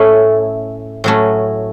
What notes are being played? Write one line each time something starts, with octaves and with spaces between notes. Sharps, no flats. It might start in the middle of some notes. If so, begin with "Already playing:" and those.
Already playing: A2 A3 C#4
A2 F#3 A3 C#4